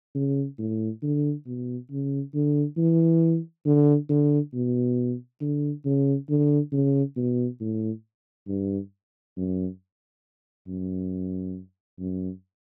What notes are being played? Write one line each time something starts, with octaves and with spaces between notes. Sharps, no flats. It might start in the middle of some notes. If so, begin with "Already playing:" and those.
C#3
A2
D3
B2
C#3
D3
E3
D3
D3
B2
D3
C#3
D3
C#3
B2
A2
G2
F#2
F#2
F#2